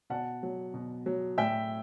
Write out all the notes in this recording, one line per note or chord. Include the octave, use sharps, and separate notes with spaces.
B2 F#5 A5
F#3
B2
F#3
A2 E5 G5